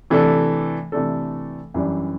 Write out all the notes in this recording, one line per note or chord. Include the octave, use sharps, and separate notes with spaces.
C3 E3 A3 D4 A4
C3 E3 A3 D4 A4
F#2 E3 G3 D4